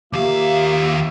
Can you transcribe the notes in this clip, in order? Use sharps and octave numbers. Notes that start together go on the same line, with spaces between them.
D#2 A#3 F4 G4 C#5 E5 F5